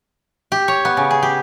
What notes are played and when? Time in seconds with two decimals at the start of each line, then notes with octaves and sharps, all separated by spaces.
0.52 G4
0.68 C#5
0.85 B3
0.97 C#3
1.11 G#4
1.23 G4